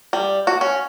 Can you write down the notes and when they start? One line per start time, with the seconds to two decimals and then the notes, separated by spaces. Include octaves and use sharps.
0.13 G3
0.47 F#4
0.61 C#4